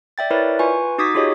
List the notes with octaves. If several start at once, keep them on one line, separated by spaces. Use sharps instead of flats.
D5 E5 G5 A6
E4 A#4 B4 C#5 D5 E5
F4 B4 G#5 C#6
D#4 F#4 D6 D#6 G#6 B6
F4 G4 G#4 C#5 D#5